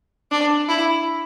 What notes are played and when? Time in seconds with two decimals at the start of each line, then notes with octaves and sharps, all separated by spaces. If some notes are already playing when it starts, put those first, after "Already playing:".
0.31 D4
0.69 E4